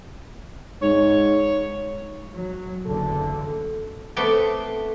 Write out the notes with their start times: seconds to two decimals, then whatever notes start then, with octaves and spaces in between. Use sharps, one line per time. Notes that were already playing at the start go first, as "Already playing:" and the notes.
0.82 G#2 C#5
2.33 F#3
2.86 F#1 E2 D3 A4
4.16 A3 B3 C4 B4 D5 G5